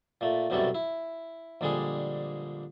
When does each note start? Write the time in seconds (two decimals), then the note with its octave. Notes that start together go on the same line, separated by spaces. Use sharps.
0.21 A#2 A3
0.50 C2 F#2 B2 G3 A3 A4
0.75 E4
1.61 A#1 D3 G3 G#3 G#4